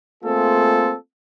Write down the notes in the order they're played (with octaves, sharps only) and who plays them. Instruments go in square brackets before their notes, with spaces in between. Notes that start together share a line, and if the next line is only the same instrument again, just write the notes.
[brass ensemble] A3 A#3 C4 F4 G#4 A4